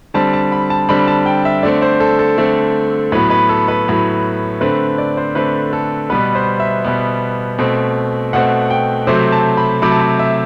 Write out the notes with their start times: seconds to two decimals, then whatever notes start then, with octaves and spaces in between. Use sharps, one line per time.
0.14 D3 G3 C4 A5
0.33 A5
0.52 B5
0.70 A5
0.89 D3 G3 C4 B5
1.07 A5
1.26 G5
1.45 E5
1.63 D3 A3 C4 D5
1.82 C5
2.00 A4
2.19 A4
2.38 D3 A3 C4
3.12 A2 F#3 B3 B4
3.30 B4
3.49 A4
3.68 B4
3.86 A2 F#3 B3
4.61 D3 A3 C4 B4
4.98 D5
5.17 C5
5.35 D3 A3 C4 B4
5.73 A4
6.10 B2 G3 B3 B4
6.35 C5
6.60 E5
6.84 B2 G3 B3
7.59 B2 A3 C4
8.33 B2 A3 C4 F#5
8.70 G5
9.07 C3 F#3 A3 C5
9.32 A5
9.57 B5
9.82 C3 F#3 A3 B5
9.92 A5
10.00 B5
10.19 E5